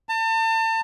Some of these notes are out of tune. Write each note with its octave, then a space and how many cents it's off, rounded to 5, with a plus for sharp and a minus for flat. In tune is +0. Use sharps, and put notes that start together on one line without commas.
A5 +35